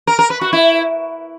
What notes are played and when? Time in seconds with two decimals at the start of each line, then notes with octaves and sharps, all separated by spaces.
0.07 A#4
0.19 A#4
0.30 B4
0.41 F#4
0.53 E4